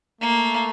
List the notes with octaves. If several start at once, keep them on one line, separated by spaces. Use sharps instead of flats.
A3 A#3